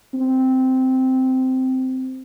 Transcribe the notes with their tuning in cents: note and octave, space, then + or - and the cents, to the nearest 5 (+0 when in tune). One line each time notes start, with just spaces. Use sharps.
C4 -10